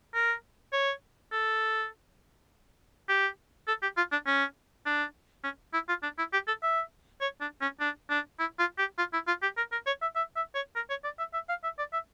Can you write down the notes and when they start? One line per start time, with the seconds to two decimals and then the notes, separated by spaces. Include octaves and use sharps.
0.14 A#4
0.73 C#5
1.32 A4
3.09 G4
3.68 A4
3.82 G4
3.97 F4
4.12 D4
4.26 C#4
4.86 D4
5.44 C#4
5.73 E4
5.88 F4
6.03 D4
6.18 E4
6.33 G4
6.48 A4
6.63 E5
7.21 C#5
7.41 D4
7.61 C#4
7.80 D4
8.10 D4
8.39 E4
8.59 F4
8.78 G4
8.98 F4
9.13 E4
9.27 F4
9.42 G4
9.57 A#4
9.72 A#4
9.86 C#5
10.02 E5
10.16 E5
10.36 E5
10.55 C#5
10.76 A#4
10.90 C#5
11.04 D5
11.19 E5
11.34 E5
11.49 F5
11.64 E5
11.78 D5
11.93 E5